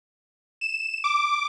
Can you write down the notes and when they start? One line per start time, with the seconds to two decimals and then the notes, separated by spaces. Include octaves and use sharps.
0.61 E7
1.04 D6